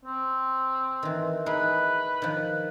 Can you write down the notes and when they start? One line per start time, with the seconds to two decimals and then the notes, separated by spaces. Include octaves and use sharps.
0.05 C4
1.03 D#3 E3
1.46 D#4 E4 G#4 B4
2.22 D#3 F3